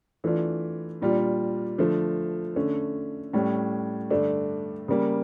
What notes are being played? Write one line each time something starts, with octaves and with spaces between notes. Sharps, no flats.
E3 A3 D4 F4
A#2 G3 D4 F4
D3 F3 A3
D3 A3 C#4
A2 G3 C#4
G2 D3 A3 D4
C#3 G3 A#3